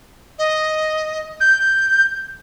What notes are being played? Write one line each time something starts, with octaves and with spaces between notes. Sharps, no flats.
D#5
G6